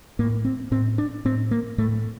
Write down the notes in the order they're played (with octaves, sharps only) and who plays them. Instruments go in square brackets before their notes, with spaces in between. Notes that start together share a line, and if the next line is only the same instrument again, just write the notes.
[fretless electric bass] A2 A#3
C4
A2 C4
D4
A2 C4
A#3
A2 A3